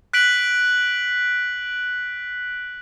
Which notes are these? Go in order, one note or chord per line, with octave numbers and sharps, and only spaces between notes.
F#6 B6 D7 F#7